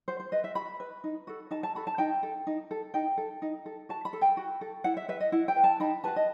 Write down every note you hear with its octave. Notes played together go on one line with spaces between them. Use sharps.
F#4 C5
C5
B4 D#5
E5
F#4 B5
B4
D#4
F#4 A4
D#4 A5
A5
F#4 A4 B5
A5
D#4 G5
A4
D#4
A4
D#4 G5
A4
D#4
A4
F#4 A5
B5
A4
G5
F#4
A4
E4 F#5
E5
B4 E5
D#5
E4 F#5
G5
B4
A5
D#4 B5
F#4 B4 A5
D#5